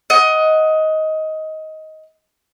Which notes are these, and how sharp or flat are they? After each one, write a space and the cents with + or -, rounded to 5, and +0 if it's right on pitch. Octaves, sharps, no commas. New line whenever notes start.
D#5 +15 F#5 +0